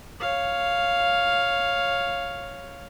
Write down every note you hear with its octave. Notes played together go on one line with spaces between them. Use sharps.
C#5 F5